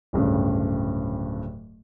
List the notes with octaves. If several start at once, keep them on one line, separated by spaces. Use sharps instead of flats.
D1 G2 C#3